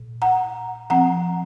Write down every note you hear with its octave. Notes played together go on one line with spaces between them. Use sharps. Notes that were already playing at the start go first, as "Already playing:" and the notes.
Already playing: A#2
F#5 A#5
F3 C4 F#5 A#5